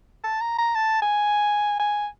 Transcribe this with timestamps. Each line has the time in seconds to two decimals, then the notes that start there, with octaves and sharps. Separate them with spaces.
0.24 A5
0.41 A#5
0.58 A#5
0.75 A5
1.02 G#5
1.79 G#5